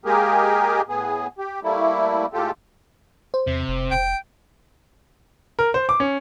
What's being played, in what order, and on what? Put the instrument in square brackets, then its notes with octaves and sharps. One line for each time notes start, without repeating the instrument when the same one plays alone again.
[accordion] G#3 A#3 G4 G#4 A#4
A2 B3 G#4
G4
G3 A3 A#3 E4
A2 G#3 F4 G4 A4
[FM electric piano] C5
[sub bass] E2 [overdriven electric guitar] C3
[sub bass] F1
[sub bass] F1 [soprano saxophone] G5
[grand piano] A#4
C5
D6
C#4